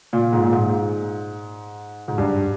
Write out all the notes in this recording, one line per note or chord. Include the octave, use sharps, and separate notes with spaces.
A#2
G#2
A#2
G#2
G#2
G2